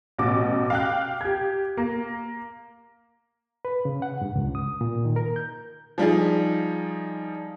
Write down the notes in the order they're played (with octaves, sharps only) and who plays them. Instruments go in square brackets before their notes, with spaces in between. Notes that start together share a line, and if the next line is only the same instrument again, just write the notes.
[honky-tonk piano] A1 B2 D6
F5 G5 F#6
G4 G#6
A#3
[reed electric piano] B4
C#3
F#5
G2
C#2
D#6
A#2
D#3
A#4
G6
[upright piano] F3 G3 D#4 G#4